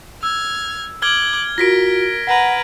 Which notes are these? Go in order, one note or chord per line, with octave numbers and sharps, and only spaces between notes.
E6 F6 G#6
D6 F6 F#6 G#6 G7
F4 F#4 A#4 A#6 B6 D7
B4 F#5 A#5